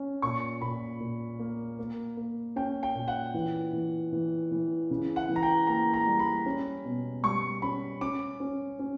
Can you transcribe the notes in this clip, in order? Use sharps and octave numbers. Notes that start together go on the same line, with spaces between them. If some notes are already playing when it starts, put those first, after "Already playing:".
Already playing: C#4
A#2 C#6
A#2 B5
A#2
A#3
A#3
A#3
C#4 G5
G5
A#2
F#5
E3
E3
E3
E3
C#3
F#5
E3
A#5
G5
A#3 A#5
A#5
G3
B5
C#4
B2
G3 C#6
C#4 B5
C#4 D6
C#4
C#4